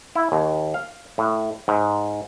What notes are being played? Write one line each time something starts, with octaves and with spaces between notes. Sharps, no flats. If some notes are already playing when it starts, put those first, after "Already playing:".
E4
D#2
F5
A2
G#2